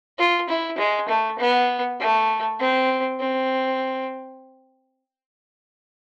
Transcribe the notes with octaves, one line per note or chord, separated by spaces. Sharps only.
F4
E4
G#3
A3
B3
A3
C4
C4